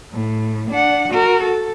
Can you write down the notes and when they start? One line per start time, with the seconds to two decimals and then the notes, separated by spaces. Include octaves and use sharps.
0.13 A2
0.70 D4 F#5
1.11 F#4 A#4
1.43 A4